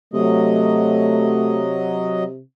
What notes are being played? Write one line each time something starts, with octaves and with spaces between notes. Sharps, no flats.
C3 F#3 A3 D#5